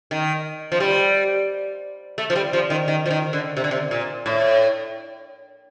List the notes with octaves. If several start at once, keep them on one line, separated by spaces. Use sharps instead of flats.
D#3
F3
G3
A3
F3
G3
F3
D#3
D#3
F3
D#3
D3
C3
D3
C3
A#2
A2